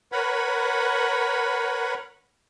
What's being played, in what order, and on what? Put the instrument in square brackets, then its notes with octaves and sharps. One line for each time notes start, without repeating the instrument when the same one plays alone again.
[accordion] A#4 B4 C#5 F#5 B5